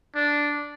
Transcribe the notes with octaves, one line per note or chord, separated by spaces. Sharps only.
D4